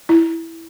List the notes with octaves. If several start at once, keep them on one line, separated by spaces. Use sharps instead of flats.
E4